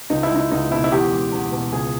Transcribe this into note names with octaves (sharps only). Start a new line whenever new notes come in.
C#2 D#4
E4
G#3 D#4
C#2 D#4
B2 E4
E4
E2 G4
G#3
E2
B2
C#2 G#4